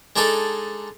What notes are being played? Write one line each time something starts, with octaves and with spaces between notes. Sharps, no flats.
G#3 D4 D#4 G#4 A4